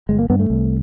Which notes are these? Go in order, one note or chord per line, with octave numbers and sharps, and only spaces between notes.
G1 G#3
A#3
G2 B3
A3
C2